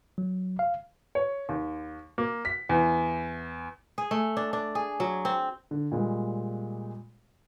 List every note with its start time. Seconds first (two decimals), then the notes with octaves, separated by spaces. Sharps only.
0.18 F#3
0.59 F5
1.15 C#5
1.49 D#2
2.18 A#3
2.45 B6
2.69 E2
3.98 G#4
4.11 A3
4.37 D4
4.53 D4
4.75 G#4
5.00 F#3
5.25 C4
5.71 D3
5.92 A#2 G3 G#3